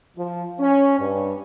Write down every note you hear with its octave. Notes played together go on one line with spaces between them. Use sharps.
F3
C#4
G2